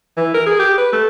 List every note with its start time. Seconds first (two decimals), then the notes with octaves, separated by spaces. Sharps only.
0.17 E3
0.34 A#4
0.46 G#4
0.60 G4
0.78 B4
0.92 A3